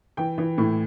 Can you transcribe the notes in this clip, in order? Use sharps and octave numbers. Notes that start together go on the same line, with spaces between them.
E3 G5
E3
A2